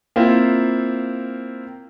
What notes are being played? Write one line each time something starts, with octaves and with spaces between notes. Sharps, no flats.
A#3 C4 E4 F4